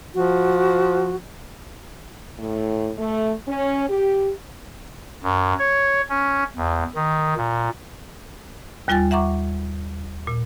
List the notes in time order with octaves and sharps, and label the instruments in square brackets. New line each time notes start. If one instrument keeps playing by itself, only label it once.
[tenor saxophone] F3 [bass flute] F#4
[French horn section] A2
A3
C#4
G4
[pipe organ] F#2
C#5
C#4
E2
D#3
A#2
[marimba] D#2 G3 F4 G5 G#5 A6
E5 F#5 A#5 C#6 D6
A#2